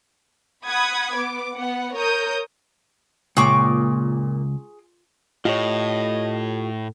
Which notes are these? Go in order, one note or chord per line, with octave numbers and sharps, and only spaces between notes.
F#5 B5 D#6 G#6
B3 D6
B3 F#5
A#4 C#5 D#6 G6
C#2 A#2 G#4 C#6 D6
A2 F4 G4 C#5 D#5